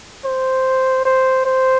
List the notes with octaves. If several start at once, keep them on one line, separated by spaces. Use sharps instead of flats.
C5
C5
C5